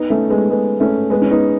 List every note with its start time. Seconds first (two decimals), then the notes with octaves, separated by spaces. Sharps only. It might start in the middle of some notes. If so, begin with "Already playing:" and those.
Already playing: B3 D#4
0.10 A3 C#4
0.30 G#3 B3
0.50 G#3 B3
0.80 A3 C#4
1.10 G#3 B3
1.22 C#4
1.31 B3 D#4